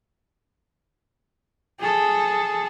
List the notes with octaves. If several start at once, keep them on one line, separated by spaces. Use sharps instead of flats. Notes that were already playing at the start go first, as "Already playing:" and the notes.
G#4 A4